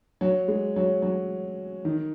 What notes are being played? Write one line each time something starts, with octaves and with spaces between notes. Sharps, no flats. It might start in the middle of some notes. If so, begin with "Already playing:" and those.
F#3
G#3
F#3
F#3
D#3